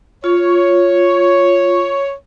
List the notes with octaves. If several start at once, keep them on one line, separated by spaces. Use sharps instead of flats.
F4 C#5